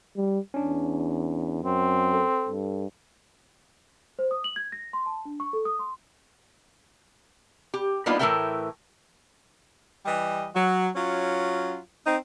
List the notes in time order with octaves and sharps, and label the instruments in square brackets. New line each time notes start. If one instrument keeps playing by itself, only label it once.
[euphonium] G3
[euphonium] E2 [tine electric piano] C#4 D4
[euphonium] F#2 [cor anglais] C4
[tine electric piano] A4
[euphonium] G2
[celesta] C5
D#6
F#7
G#6
A#6
C6
A5
D4
C#6
A4
D#6
C6
[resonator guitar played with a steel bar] G4
G3 A#3 B3 D4 D#4 F4
A2 E3 A3 A#4 E5 G5
[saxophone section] E3 G3 D#5
F#3
F#3 C#4 F4
C4 D#4